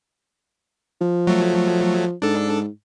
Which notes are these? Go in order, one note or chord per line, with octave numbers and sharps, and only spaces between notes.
F3
F#3 A3
G#2 D4 A4